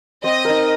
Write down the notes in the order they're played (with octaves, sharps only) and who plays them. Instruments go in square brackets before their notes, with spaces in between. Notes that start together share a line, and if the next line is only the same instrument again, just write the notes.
[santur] C4 [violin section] D#5
[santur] D#4 A#4